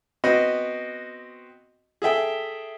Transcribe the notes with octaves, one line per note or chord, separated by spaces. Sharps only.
B3 C4 F#4 D#5
G#4 A4 E5 G5